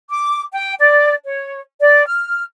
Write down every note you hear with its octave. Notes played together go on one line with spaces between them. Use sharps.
D6
G5
D5
C#5
D5
F6